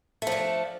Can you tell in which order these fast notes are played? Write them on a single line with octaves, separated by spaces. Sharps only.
A3 F3 D4